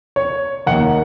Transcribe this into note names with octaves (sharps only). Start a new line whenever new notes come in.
C#5
D#2 D#3 A#3 F#5